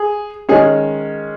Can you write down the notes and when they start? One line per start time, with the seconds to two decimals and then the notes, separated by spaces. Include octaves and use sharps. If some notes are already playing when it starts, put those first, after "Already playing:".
Already playing: G#4
0.49 D#3 G#3 C#4 G#4